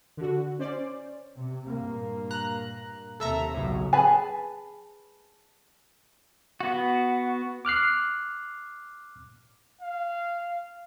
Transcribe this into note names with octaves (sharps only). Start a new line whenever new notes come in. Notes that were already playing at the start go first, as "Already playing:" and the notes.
D3 F#4
C#4 C5 D5
C3
G2 A#2 A#3
A#5 F#6
D#2 C3 A4 E5 A#5
B1 A2 C#3 F#3
G#4 B4 A5 B5
B3 F#4
D6 F6 F#6 C7
F5